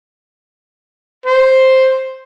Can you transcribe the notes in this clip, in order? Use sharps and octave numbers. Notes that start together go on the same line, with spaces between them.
C5